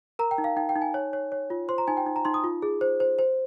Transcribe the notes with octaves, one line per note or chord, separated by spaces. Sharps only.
A#4 A#5
G5
D#4
F5
D#4 G5
G5
D#4
G#5
C#5
C#5
C#5
F4
C5 C6
A#5
D#4 G#5
G5
D#4
A#5
D#4 C6
D#6
F4
G#4
C5
C5
C5